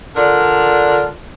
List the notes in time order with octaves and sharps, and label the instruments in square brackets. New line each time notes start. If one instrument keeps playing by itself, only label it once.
[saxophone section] D3 F4 A#4 D5